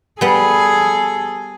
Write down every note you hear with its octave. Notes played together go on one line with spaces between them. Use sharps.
G3 B3 G#4 A4